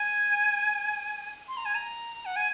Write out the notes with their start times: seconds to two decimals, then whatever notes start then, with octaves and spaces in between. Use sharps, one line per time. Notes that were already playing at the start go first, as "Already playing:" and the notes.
Already playing: G#5
1.48 C6
1.57 A#5
1.65 G#5
1.75 A#5
2.26 F#5
2.36 G#5